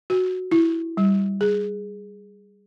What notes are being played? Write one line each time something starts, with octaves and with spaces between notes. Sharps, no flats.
F#4
E4
G3
G#4